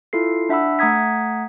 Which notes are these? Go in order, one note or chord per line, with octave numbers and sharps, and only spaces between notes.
E4 F4 A4 C7
D4 E5 F#5 B5 E6
A3 F#5 A#5 D#6 G#6 B6